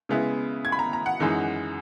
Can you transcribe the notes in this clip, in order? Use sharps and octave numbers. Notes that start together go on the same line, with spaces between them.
C#3 G#3 B3 E4
G#6
B5
A#5
A#5
F#5
F#2 E3 G#3 D#4